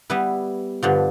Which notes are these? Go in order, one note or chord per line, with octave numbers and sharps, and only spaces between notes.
G3 B3 E4 B4
G2 D3 F3